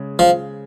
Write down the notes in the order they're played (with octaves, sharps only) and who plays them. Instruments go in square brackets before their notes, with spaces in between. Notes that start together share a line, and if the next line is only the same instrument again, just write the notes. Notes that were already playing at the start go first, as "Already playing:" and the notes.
Already playing: [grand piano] C#3 G#3
[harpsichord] F3